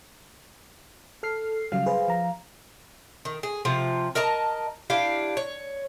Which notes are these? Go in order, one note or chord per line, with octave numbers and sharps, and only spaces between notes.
A4 F6 C7
C#3 F#3 G3 F5
G#4 B4 C5
F3 A#5
D#3
G#4
C3 F3 F4
A#4 D#5 A5 A#5
D4 E4 G4 F5
C#5